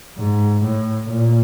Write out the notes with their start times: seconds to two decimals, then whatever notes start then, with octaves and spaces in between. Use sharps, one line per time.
0.18 G#2
0.63 A2
1.09 A#2